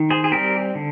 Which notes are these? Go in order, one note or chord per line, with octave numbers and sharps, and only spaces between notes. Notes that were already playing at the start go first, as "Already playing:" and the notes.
Already playing: D#3
G#4 C5
G#4
G3 C4 G4 A#4
D3